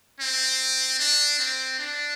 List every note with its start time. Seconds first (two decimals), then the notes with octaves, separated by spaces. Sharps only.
0.20 C4
0.99 D4
1.39 C4
1.79 D4